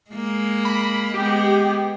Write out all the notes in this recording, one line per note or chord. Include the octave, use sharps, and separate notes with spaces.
G#3 A#3
B5
G#3 B3 G4